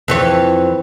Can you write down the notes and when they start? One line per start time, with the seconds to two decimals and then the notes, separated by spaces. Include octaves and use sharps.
0.08 F2 E3 C#5